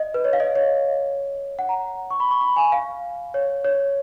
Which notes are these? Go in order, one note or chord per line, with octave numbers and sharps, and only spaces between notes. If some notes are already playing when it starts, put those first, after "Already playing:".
Already playing: D#5
B4
C#5
F5
D#5
C#5
F#5
A#5
C#6
B5
C#6
B5
G#5
F5
C#5
C#5